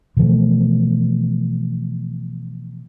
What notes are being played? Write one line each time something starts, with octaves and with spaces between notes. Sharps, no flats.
B2 E3 F3 A3